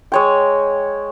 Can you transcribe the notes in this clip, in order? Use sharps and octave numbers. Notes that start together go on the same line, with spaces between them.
G#3 C#5 G5